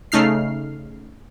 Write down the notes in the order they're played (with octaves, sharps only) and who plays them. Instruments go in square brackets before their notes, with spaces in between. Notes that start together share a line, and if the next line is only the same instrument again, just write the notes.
[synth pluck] C#3 A3 D#4 F6 C7